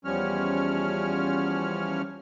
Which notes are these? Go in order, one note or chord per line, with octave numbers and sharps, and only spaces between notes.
E2 F3 G3 C#4 C#5 F6